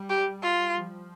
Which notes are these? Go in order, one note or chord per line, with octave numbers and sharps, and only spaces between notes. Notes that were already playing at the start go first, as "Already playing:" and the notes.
Already playing: G3
G4
F4
F3